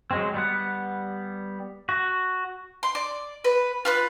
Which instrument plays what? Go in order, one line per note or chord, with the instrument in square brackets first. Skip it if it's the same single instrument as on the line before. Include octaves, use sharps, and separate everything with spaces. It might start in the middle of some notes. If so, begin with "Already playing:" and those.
[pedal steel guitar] F#3 G#3 C4
G3 B3 F#5
F#4
[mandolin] C6
D5
B4
F4 B4 F#6